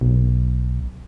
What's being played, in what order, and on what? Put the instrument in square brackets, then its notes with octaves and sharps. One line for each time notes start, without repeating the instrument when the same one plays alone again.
[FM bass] B1